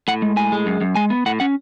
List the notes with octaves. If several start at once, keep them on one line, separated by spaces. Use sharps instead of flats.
A2 F#5
G#3
A2 G#5
G#3
F#2
F#2
G#3 G#5
B3
A2 F#5
C#4 F#5